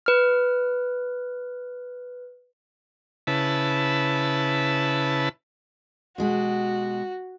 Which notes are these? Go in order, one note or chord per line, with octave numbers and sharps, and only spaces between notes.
B4 F6
C#3 E4 B4 A5
B2 G#3 F#4 G4